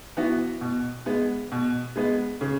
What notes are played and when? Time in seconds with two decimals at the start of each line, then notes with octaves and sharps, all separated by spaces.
0.17 E3 B3 F#4
0.61 B2
1.06 G#3 B3
1.51 B2
1.96 G#3 B3
2.41 C#3